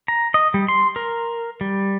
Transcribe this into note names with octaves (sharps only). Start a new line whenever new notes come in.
A#5
D#5
G3
C6
A#4
G3